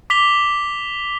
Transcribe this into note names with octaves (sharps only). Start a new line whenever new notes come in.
D6 B6 F7 G7